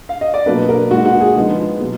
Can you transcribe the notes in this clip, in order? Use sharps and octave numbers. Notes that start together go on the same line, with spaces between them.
F5
D#5
D5
B2 F#3 A#3 D4 B4
A#4
A#2 G#3 D#4 F#4
F#4
G#4
D3 F3 G#3 B3 D#4
B2 F#3